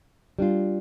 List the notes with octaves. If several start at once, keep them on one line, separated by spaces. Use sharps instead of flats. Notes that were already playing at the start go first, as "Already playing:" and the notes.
G3 D4 F4